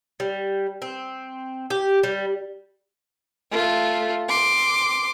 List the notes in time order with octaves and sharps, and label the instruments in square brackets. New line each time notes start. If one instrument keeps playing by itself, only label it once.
[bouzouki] G3
C4
G4
G3
[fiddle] A3 F4
C6 D6